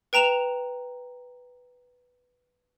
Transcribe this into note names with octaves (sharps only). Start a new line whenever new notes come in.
B4 G5 A#5 E7 F7